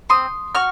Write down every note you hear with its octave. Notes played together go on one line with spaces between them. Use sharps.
C4 C6 D#6
F#4 C#6 F6